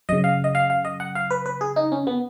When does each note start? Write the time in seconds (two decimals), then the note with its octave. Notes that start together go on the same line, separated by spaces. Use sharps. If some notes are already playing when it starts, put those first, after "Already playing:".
0.09 F#2 C#3 D#5
0.24 F5
0.44 D#5
0.55 F5
0.70 F5
0.85 D#5
1.00 F#5
1.15 F5
1.30 B4
1.46 B4
1.61 G#4
1.76 D#4
1.92 C#4
2.07 B3